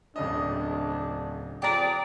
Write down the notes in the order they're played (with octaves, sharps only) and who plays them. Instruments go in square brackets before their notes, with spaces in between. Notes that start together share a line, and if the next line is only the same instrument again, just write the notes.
[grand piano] D1 C#3 D#5 [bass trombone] D4
[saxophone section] F2 G#4 D5 [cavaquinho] G4 A#5